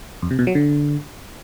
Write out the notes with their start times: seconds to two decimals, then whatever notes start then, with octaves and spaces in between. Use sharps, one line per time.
0.22 F2
0.31 C3
0.39 B2
0.47 F#3
0.55 D3